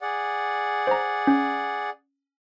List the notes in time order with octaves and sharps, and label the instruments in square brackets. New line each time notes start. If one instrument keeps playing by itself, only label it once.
[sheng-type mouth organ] G#4 D5 F#5
[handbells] C5 A#5
C#4